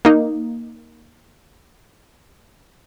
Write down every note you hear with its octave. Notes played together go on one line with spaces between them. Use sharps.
A#3 D#4